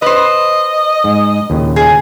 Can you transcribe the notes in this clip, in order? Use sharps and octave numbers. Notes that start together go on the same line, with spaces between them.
B4 C5 D#5
G#2
D#2 A#2 C#3
G#4